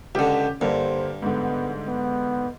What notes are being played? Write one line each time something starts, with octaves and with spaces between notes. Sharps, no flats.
C#2 D3 C#4 G4
G2 D3 G3 A#3 C5
G#2 D3 B3
B3